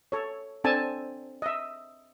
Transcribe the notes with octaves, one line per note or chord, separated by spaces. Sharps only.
A4 C#5
C4 D4 A4 G#5 A5
D#5 E5